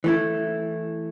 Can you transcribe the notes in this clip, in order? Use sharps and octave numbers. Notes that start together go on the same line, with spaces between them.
E3 A3 E4